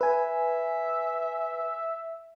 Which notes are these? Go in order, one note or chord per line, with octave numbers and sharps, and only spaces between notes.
B4 E5 G#5